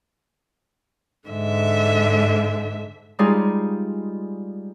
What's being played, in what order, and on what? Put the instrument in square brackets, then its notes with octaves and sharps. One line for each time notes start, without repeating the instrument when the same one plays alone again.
[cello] G#2 [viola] D3 E5
[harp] G3 G#3 D#4 F4 G#4